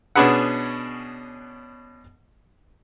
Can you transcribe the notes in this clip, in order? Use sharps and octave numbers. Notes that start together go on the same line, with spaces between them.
B2 C#4 D4 G#4 B4 F#5